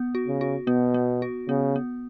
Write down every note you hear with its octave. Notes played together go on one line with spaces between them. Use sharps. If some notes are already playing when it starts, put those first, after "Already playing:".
Already playing: B3
F#4
C#3
F#4
B2 B3
B3
F#4
C#3 B3
B3